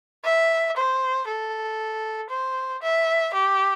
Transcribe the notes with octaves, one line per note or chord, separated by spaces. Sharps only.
E5
C5
A4
C5
E5
G4